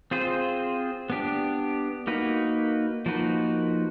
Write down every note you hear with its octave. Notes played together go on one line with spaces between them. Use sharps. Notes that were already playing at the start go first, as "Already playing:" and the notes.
C4 F4 G#4 C5
B3 D4 G4
A#3 D#4 F#4 B4
F3 A#3 D#4 F#4 B4